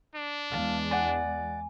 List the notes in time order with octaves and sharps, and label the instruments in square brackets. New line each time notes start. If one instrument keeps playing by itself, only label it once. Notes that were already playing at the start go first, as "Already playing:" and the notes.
[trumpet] D4
[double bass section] E2 G#3 [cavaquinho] F5 A5
[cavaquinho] D5 F#5 [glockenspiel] G#5